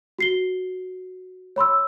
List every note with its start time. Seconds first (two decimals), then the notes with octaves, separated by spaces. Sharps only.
0.19 F#4 C7 G7
1.56 C#5 B5 C6 E6